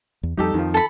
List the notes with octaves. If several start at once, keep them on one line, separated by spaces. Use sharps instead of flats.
E2
F2 G3 D#4 G4 A4
F2 D#3 F3
A4 B5